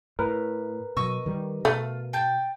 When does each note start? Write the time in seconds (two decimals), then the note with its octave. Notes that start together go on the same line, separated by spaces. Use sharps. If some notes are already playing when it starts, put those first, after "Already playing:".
0.19 A2 A#4 B4
0.97 B2 F#3 D#5 C#6 E6
1.26 D#3 G3
1.65 B2 A3 F4
2.13 G5 A5 G6